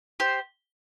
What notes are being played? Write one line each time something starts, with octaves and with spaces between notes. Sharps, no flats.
G4 C5